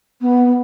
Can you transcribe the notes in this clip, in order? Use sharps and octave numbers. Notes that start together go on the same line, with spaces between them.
B3